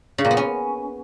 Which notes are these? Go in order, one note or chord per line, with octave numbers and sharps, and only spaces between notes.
C#3
A#2
B3
C#4